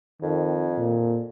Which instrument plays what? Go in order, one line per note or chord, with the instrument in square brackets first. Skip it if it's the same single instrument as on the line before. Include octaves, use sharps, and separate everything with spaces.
[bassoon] F2 [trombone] D#3
[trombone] A#2